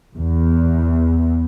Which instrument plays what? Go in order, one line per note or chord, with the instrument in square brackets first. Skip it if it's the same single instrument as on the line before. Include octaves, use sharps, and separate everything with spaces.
[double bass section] E2